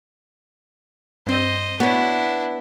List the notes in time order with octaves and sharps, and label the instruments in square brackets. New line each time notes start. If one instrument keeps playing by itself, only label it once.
[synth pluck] G2 C4 [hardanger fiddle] C5 D#5
[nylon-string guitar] B3 [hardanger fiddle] D4 E4 [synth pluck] F#4 C#5